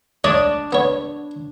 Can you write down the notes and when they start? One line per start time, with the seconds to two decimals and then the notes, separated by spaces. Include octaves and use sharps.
0.24 D4 C#5 D#5 D#6
0.73 B3 C#5